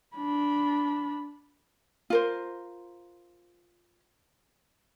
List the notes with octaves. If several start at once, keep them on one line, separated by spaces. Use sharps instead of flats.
D4 B5
F4 A#4 C5